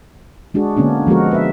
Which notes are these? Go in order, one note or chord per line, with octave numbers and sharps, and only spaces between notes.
G#3 D4 F#4 G#4
D3 A#3 B3 C#4 D4
F3 G#3 B3 F#4 A#4
B4 E5